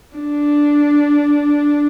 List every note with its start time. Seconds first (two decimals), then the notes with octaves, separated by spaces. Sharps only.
0.18 D4